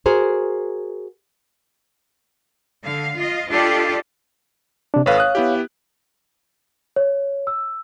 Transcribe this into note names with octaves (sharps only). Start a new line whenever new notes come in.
F#4 G#4 A#4 C5
D3 F5
F4 D#5
D4 F4 G4 A4 D5 D#5
C3 D4
G#1 A4 B4 C#5 F5
D#6 F#6
B3 E4 G4
C#5
E6